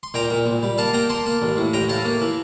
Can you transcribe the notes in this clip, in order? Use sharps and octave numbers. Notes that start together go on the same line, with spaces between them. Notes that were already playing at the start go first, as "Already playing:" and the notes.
C6
A#2 G5 A#5
A#2
A#1
G3
A#3 F5 A5
A#3 G5 A#5
A#3 A5 C6
A#3
A1
A2
A1 G5 A#5
A2 F5 A5
A#3
E3